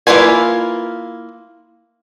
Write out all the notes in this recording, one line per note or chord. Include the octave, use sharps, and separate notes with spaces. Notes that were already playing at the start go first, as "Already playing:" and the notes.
A#3 E4 F4 B4 G#5